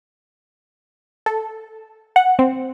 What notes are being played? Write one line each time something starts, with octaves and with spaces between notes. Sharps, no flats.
A4
F#5
C4